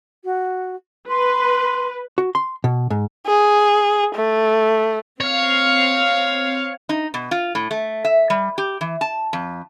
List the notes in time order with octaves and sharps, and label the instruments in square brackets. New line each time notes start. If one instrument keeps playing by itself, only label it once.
[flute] F#4
[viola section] B4 [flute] C6
[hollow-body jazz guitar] F#4
C6
B2
G#2
[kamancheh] G#4
A3
[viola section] C4 F5 [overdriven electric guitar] C#5
[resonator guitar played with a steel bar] D#4
B2
F4
A2
A3
E5
G3
G4
E3
A5
F2